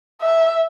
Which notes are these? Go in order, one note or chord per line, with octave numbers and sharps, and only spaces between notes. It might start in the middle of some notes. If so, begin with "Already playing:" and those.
E5